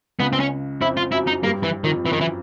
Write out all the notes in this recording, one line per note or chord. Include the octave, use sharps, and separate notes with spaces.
C#2 C#3 B3
C4
C#4
F2 F3 E4
F4
F#2 F#3 E4
D#4
G2 G3 A#3
E3
F2 D#3 F3
F#2 E3 F#3
D#3
E3